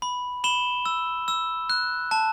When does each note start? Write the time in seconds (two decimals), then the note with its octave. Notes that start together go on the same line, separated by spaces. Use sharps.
0.02 B5
0.44 B5 E7 G7
0.86 E6
1.28 E6
1.70 F#6
2.11 A5